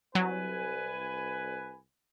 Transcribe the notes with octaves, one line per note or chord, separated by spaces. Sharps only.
C2 F#3 B4 G#5